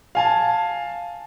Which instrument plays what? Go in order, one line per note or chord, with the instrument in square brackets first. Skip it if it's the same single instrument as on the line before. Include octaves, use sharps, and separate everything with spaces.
[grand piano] F5 G#5 A5